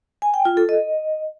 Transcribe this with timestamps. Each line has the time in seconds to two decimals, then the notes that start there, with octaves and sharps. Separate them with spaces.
0.22 G#5
0.34 G5
0.45 F4
0.57 A4
0.69 D#5